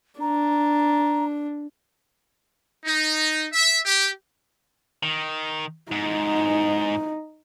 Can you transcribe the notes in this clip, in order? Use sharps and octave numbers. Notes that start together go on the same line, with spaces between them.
D4 A#5
D#4
E5
G4
D#3
G#2 D#4